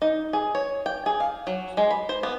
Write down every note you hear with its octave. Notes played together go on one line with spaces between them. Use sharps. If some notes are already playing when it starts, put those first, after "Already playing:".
D#4
G#4
C#5
G5
G#4
F5
F#3
G#3
B5
C5
B3